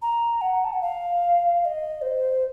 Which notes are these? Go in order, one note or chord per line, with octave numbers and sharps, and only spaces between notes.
A#5
F#5
A5
F#5
F5
F5
D#5
C5